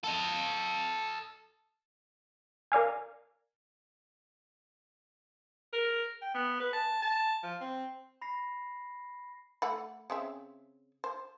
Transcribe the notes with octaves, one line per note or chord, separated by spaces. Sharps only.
A4 D#5
A#4 D5 F5 G#5
A#4
G5
B3
B4
A5
A5
F3
C4
B5 A#6 C7
A3 F#5 B5
C#3 C4 E5
C5